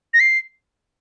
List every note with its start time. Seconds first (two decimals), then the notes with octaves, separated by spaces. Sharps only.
0.14 A#6
0.20 C7